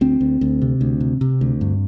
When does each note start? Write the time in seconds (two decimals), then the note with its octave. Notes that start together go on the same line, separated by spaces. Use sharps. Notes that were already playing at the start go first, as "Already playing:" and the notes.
0.01 D2 C4
0.21 D2
0.41 D2
0.62 C3
0.81 D2
1.01 C3
1.21 C3
1.41 D2
1.61 G2